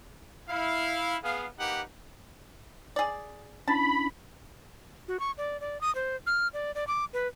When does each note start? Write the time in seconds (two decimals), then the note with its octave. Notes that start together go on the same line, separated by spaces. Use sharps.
0.49 E4 F5
1.24 B3 G#4 F5
1.59 A#3 D#4 G4 B4 F#5
2.96 G#4 D5
3.68 C#4 D4 E4 A5 B5
5.08 F#4
5.20 C#6
5.38 D5
5.61 D5
5.81 D#6
5.95 C5
6.26 F6
6.54 D5
6.75 D5
6.88 D6
7.13 B4